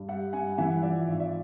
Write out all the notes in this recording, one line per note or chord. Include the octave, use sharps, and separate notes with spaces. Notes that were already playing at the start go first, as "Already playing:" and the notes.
Already playing: G2
G3 E5 F#5
G2 F#5 G#5
E3 E5 F#5
F3 D5 E5
G#1
D5 E5